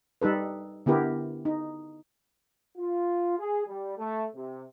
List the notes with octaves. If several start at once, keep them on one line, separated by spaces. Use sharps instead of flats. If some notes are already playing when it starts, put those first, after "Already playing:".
G3 D#4 A4 B4
D3 B3 E4 G4 A#4
D#4
F4
G#4
G3
A3
C3